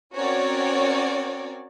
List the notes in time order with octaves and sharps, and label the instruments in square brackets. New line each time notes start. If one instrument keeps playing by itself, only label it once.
[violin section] C4 C#4 F#4 A#4 C#5 D5